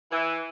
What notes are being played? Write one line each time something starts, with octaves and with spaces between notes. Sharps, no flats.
E3